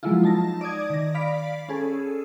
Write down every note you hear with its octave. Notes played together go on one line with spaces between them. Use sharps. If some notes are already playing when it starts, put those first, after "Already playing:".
F3 F#3 G#3 A#3 E4 F4
D#4 A5 A#6
D5 D6 D#6 G#6
D#3 A#6
D5 F5 B5 B6 D7
C#4 G#4 A4